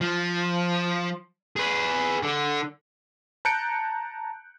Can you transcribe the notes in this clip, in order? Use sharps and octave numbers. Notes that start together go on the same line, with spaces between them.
F3
G#4 B4
D3
A5 A#5 F#6 G6 C#7 D7